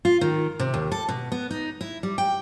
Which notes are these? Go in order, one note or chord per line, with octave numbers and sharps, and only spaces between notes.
F4
D#3
C3
D#2
A4
B2
B3
D#4
E4
G3
G5